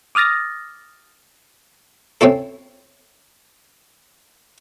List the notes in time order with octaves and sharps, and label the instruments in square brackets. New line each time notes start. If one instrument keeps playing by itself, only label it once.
[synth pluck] D6 D#6 F6 A6 A#6
[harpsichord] C4 C#4 E4 A4